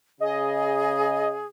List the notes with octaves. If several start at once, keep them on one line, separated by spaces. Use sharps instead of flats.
C#3 G#4 D#5